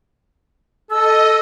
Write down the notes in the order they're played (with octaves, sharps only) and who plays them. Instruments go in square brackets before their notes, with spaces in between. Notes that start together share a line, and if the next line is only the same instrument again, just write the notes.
[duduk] A4 [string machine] D#5 [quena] E6